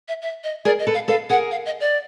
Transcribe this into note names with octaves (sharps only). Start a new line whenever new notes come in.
E5
E5
D#5
G#4 A#4 D5
D#5
A4 B4
F5
A4 B4 F5
G#4 A#4 F#5
F5
D#5
D5